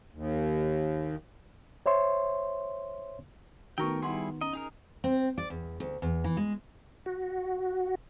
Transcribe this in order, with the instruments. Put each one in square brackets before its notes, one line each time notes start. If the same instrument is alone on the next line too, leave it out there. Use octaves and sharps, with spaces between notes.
[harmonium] D#2
[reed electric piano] C5 C#5 E5 C6
[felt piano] D#3 B3 [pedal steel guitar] A3 A#4 G5 [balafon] F#4 C#6
[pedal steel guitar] G3 E4 G#4 [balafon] D#4 F#5 C6
[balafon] C#4 [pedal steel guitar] D#5
[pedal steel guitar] D#4 G#4 A#4
[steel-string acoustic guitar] C4
D5
E2
D2
E2
E3
G#3
[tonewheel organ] F#4